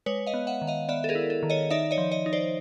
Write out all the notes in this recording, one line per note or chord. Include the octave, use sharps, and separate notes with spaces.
G#3 B4 C#5
D#5 F5
B3
E5 F#5
D#3
D#5 F5
B3 D5 E5
A4
G#4 A#4
E4
A4
D#3
C#5 D#5
D#4 D5 E5
C#5 D#5
F3
C#5 D#5
D#4
C5 D5